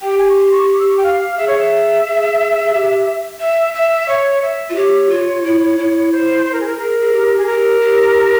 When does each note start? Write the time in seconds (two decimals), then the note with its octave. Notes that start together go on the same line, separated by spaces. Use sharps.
0.01 G4 G5
0.18 G#5
0.29 C#6
0.36 C6
0.52 C#6
0.70 C#6
0.79 E6
0.89 C#6
0.97 G5
1.04 F5
1.37 G#4 E5
1.48 C#5
1.58 E5
2.05 G#4
2.59 G#4
2.73 G4
3.40 E5
3.74 E5
4.08 C#5
4.42 E5
4.70 F4
4.75 G4 C#5
5.10 F4
5.44 E4
5.77 E4
6.12 C5
6.45 C5
6.52 A#4
6.60 G#4
6.66 A#4
6.78 G#4 A#4
7.01 G#4
7.12 G4
7.37 G#4
7.46 G4 A#4
7.81 G4